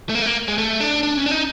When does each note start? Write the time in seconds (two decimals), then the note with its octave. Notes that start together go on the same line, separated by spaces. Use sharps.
0.09 A3
0.15 A#3
0.22 A3
0.26 A#3
0.48 G#3
0.58 A3
0.80 D4
1.03 D4
1.17 C#4
1.26 D4
1.31 D#4